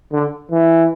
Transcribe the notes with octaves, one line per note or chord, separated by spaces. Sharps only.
D3
E3